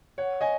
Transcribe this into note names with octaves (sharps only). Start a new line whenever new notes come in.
C#5 F#5
D#5 G#5